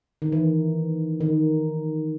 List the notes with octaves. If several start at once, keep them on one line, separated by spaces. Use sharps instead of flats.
D#3
E3
D#3